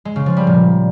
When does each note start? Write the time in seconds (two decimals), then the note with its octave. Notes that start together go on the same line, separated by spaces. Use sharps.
0.05 G#3
0.16 C#3
0.26 F3
0.37 G3
0.47 A#2